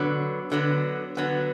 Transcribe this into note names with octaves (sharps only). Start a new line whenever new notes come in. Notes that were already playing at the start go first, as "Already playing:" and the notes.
Already playing: D3 F#3 B3
D3 F#3 B3
D3 F#3 B3